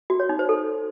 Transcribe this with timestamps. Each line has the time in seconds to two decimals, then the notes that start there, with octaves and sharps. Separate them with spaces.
0.10 F#4
0.20 C#5
0.29 D#4
0.39 C5
0.49 A4